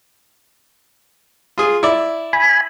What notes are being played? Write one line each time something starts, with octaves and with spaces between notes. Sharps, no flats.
F4 G#4
E4 D5
G#5 B5